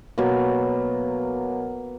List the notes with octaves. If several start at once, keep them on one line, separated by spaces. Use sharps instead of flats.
B2 F#3 A#3